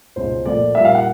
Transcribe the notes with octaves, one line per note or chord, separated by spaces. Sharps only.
C#2 B2 G#3 C5
A#2 F3 A3 C4 D5
A#2 G3 A#3 E5
F5
F#5